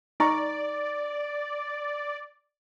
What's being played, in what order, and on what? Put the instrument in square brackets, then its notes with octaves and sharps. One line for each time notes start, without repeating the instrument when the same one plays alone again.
[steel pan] D#4 A#5 C#6 [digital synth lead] D5